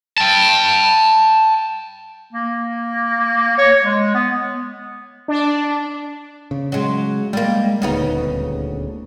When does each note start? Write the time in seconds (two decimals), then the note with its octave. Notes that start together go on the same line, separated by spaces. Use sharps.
0.18 G5 A5
2.33 A#3
3.58 C#5
3.83 G#3
4.14 B3
5.28 D4
6.51 C#3
6.72 F#3 G#3
7.33 G3 G#3 A#3
7.82 D#1 D2 C#3 B3 D#4